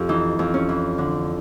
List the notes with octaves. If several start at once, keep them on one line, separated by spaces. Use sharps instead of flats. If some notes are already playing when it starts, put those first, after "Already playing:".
Already playing: F2 G4
E3 D#4
F2
C#4
E3
D3 D4